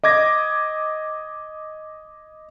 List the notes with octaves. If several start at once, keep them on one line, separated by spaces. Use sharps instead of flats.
D#5 D6 G#6 A#6